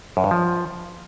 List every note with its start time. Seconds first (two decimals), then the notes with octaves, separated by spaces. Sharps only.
0.17 F#2
0.24 G2
0.31 F3